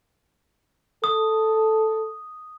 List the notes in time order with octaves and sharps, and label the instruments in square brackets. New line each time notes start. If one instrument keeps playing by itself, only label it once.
[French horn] A4 [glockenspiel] D#6